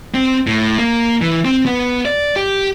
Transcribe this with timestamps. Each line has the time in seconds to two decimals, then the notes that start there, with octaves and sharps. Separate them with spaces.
0.14 C4
0.47 A2
0.78 A#3
1.21 E3
1.45 C4
1.66 B3
2.05 D5
2.36 G4